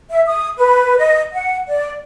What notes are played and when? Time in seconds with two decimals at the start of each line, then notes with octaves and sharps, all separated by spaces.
0.10 E5
0.27 D#6
0.57 B4
0.98 D#5
1.33 F#5
1.69 D5